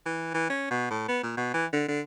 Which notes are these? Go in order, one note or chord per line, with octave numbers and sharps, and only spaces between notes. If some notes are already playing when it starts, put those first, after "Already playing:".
E3
E3
C#4
B2
A2
B3
A#2
B2
E3
D3
D3